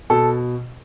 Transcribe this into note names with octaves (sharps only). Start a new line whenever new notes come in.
B2 A4